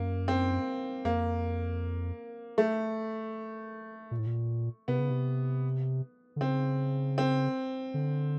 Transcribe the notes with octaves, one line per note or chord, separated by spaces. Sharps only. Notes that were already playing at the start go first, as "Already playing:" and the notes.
Already playing: F#2 A#3
C4
F2 A#3
A3
A#2
A2
A#2
C3 B3
C#3
C3
D3
C#3 C4
C4
D3